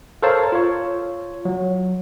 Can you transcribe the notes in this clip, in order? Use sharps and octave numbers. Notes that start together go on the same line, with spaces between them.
A4 A#4 C5 C#5 F5 A5
F4 C#5
F#3